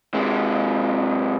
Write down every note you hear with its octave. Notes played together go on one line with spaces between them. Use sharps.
C3 G#3